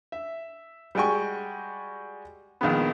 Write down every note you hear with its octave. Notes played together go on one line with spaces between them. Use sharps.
E5
G3 G#3 F#4 G5 G#5 C#6
A#1 D#3 G#3 B3